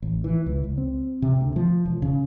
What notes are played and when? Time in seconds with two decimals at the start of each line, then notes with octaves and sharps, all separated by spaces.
0.02 A1
0.24 E3
0.46 C#2
0.64 C#2
0.78 C4
1.22 C3
1.41 D2
1.56 F3
1.85 E1
2.02 C#3